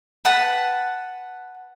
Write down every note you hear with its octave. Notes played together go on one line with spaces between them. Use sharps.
B4 F#5 A5